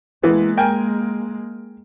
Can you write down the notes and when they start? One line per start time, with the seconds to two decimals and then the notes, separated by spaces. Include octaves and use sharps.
0.23 E3 G#3 A#3 B3
0.57 A#4 G5 G#5